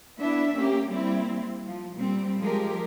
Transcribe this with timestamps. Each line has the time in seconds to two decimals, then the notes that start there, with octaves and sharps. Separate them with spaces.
0.18 B3 D4 E4 E5
0.56 A#3 C#4 G4
0.89 G3 A#3 C4 E4
1.66 F3
1.96 A#2 G3 C4
2.38 F3 G#3 G4 A#4